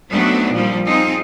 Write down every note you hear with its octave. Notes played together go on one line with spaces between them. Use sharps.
F#3 A3 B3 C4 D4 D#4
A#2 F3 G3
C4 D#4 F4 G#4